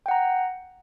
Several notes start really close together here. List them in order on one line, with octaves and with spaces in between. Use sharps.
G5 F#5 A#5